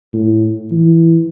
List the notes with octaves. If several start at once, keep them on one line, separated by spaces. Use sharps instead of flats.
A2
E3